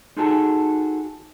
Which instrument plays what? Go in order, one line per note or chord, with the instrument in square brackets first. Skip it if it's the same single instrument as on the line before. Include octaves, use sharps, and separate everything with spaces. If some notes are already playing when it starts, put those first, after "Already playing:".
[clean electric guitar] D#4 F4 F#4 G#4 A4 A5